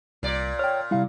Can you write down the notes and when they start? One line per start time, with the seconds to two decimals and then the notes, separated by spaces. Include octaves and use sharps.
0.23 C2 A#2 D5
0.59 C#5 G5 F6
0.91 C3 G3 E4 F5